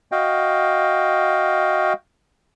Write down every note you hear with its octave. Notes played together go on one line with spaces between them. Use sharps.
F#4 D#5 F5 G5